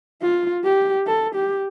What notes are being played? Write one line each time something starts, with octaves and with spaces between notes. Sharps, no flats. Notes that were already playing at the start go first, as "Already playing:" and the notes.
F4
G4
A4
G4